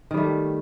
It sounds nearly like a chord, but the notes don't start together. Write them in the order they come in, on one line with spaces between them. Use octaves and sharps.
D#3 G3 A3